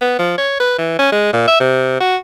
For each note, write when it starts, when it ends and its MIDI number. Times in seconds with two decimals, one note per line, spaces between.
0.01 0.17 59
0.19 0.33 53
0.38 0.57 73
0.60 0.75 71
0.78 0.95 52
0.99 1.09 61
1.12 1.33 56
1.33 1.44 46
1.48 1.58 76
1.60 1.97 48
2.01 2.17 66